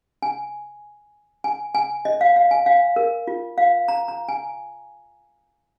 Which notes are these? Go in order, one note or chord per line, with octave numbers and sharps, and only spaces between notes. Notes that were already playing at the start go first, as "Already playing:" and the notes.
G#5
G#5
G#5
D#5
F5
F5
G#5
F5
A#4
F4
F5
A#5
A#5
G#5